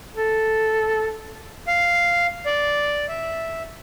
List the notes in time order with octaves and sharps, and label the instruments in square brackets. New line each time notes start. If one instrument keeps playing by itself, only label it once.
[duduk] A4
[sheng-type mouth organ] F5
D5
E5